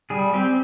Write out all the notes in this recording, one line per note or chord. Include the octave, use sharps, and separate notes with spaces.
G3 G#4
C4 G4